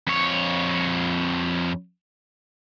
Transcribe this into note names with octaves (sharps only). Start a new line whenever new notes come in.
F2 C#5